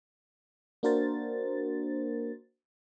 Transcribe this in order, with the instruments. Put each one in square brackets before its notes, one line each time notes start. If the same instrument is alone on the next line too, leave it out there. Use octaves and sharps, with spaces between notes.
[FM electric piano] A#3 D4 F#4 A#4 C5 A6